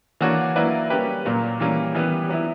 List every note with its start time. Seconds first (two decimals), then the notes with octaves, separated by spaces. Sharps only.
0.20 E3 A#3 D4 F#4 C#5
0.56 F#3 A#3 E4 B4 D5
0.90 G3 A#3 C#4 G4 B4
1.25 A#2 F#3 A#3
1.60 E3 G3 A#3 C#4
1.94 E3 G3 B3
2.29 F#3 B3 E4